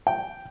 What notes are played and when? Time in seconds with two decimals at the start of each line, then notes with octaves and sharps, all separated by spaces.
0.07 G5